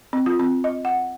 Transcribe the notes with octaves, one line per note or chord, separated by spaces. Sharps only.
C4
F4
C4
D#5
F#5